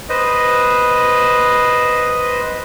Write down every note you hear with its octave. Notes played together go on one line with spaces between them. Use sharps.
B4 C5 D#5